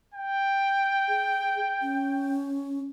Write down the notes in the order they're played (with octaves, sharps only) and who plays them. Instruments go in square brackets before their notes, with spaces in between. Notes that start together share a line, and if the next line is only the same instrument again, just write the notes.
[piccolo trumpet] G5
[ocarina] G#4
C#4